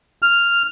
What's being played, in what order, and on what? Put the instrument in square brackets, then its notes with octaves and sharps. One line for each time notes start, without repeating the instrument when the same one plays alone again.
[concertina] F6